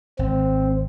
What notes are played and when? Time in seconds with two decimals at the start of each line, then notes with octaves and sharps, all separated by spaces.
0.19 G#1 C4